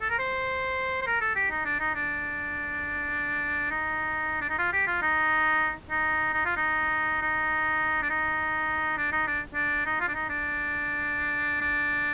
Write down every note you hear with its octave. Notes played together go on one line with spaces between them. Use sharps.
A4
A#4
C5
C5
A#4
A4
G4
D#4
D4
D#4
D4
D#4
D4
D#4
F4
G4
F4
D#4
D#4
D#4
F4
D#4
D#4
D4
D#4
D4
D#4
D4
D4
D#4
F4
D4
D#4
D4
D4